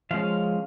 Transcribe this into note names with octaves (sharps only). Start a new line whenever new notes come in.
F3 G#3 C#4 F5